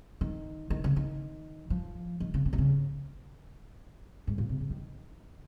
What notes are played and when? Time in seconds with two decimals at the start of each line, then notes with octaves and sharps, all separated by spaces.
0.21 D#3
0.70 D#3
0.84 C#3
0.96 D#3
1.70 F3
2.20 D#3
2.34 C#3
2.46 C#3
2.53 C3
2.58 C#3
4.27 G#2
4.38 A#2
4.49 C3
4.60 C#3
4.70 D#3